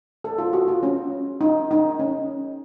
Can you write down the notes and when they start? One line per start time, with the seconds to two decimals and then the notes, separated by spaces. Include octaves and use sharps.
0.24 A4
0.38 F4
0.53 F#4
0.68 F4
0.83 C#4
1.41 D#4
1.71 D#4
1.99 C#4